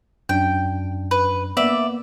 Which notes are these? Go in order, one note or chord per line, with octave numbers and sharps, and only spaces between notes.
F#2 D4 G5
B4
A#3 B3 D5 E5